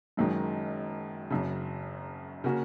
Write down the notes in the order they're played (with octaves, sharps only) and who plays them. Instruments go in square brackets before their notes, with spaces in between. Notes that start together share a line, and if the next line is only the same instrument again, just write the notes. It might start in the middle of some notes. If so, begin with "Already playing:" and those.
[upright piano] F#1 F#2 D#3 G#3
F#1 F#2 C#3
C#3 A#3 C#4 F#4